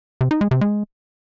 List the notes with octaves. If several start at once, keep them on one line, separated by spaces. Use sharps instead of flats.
C3
D#4
G#3
C3
G#3